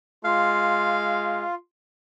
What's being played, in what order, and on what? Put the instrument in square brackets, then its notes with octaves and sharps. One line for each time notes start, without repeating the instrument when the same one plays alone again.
[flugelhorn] G#3 [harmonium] F4 [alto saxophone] F5